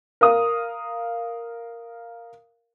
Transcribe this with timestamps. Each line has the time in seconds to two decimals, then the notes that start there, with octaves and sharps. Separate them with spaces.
0.21 A#4 F5 D#6